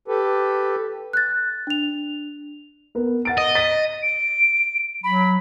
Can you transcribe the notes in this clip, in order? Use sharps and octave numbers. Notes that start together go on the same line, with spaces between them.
G4 A4 B4
F#6 A6
D4 F7
B3 A#4
F#5 A6 D7
D#5
A6 B6 D#7
D7
F#3 B5